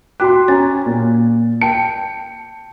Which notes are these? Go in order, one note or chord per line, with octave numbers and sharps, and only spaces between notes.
F#4 G5 C6 D6 F#6
C#4 G#5 A#5 A6
A#2
G5 A5 C#7